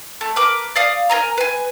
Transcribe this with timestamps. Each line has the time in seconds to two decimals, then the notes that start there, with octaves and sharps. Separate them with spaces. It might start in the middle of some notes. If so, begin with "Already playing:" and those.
0.21 A3
0.36 A#4 B4 D6
0.76 D5 F5 D#6
1.09 A#4 D#5 G#5 A#5
1.38 B4 G#5